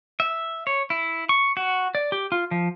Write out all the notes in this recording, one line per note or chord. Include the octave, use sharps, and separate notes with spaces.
E5
C#5
E4
C#6
F#4
D5
G4
F4
F3